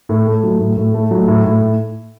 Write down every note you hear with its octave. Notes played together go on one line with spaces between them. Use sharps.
A2
A3
F#3
A2
A2
A3
F#3
A2
A2